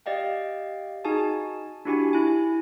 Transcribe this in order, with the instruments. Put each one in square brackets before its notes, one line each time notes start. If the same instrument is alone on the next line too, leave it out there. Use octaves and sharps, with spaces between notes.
[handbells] G4 D5 D#5 F5 G5
D#4 F#4 G#4 D#5 G#5 A5
D4 E4 F#4 G4 G#5 B5
E4 G#5